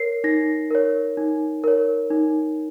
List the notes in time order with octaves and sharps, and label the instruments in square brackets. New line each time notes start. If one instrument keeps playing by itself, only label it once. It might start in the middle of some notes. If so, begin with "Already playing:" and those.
Already playing: [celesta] A#4 C#5 C7
D#4 A#6
A#4 C#5
D#4
A#4 C#5
D#4